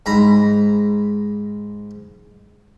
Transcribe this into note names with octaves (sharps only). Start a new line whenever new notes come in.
G#2 A#5 B5